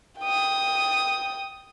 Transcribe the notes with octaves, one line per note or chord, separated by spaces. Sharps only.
G5 D#6